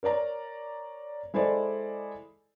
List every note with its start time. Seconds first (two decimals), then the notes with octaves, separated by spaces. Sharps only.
0.03 A#4 C#5 D5 A#5
1.34 G#3 E4 A4 C5 D5 D#5